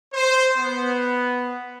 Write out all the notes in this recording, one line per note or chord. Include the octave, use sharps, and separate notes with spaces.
C5
B3